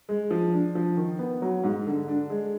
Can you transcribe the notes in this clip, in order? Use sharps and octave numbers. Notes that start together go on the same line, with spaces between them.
G#3
F3
D4
F3
D#3
B3
F#3
G#2
D3
D4
G#3